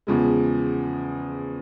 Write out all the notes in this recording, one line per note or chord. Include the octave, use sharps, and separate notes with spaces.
E2 C#3 F3 G#3